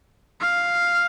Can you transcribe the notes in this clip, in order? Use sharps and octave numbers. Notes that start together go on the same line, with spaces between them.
F5